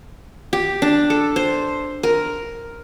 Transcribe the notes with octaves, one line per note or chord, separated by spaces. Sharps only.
G4
D4
A4
C5
A#4